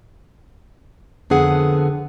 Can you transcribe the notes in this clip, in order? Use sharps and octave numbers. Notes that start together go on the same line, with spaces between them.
F2 D3 B3 G#4 F#5